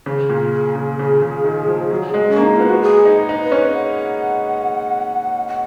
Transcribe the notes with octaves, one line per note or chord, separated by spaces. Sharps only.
C#3
A#2
G#4
C#3
C#3
C#3
D#3
F3
F#3
G#3
C#4
A#3
D#4
B3 F4
F#4
G#4
D#4
D#4
B4
C#4
F#5
F#5